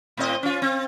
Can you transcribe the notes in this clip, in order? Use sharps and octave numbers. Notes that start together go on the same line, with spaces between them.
A2 C4 D#5
C#4 F4
C4